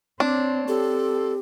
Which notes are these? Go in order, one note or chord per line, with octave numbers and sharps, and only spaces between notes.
C4 D4 C#5
C4 G4 A4